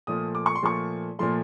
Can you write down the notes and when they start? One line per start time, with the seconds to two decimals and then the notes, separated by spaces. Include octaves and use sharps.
0.07 A#2 F3 A3 D#6
0.35 D6
0.46 C#6
0.55 C6
0.63 A#2 F3 A3 C#6
1.19 A#2 F3 A3 C6